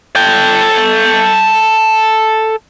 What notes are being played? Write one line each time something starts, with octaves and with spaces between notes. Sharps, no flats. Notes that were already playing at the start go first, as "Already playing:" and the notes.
A4 G5